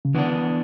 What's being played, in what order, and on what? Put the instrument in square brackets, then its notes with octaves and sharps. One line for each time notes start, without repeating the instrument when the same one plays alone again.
[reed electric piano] C#3
[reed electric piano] D3 [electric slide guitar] E3 B3 D4